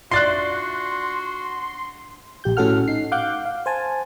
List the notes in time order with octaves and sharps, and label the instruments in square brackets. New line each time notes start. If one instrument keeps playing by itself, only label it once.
[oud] D4 F4 E5 [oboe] F#4 [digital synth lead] C6 [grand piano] F#6 A6 C7
[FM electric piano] A#1 G4 G6
A2 C#4 F#4 A4 F#5 F6
D#4 C7
F5 F#5 D6 F#6 G6
F5
C5 G#5 A5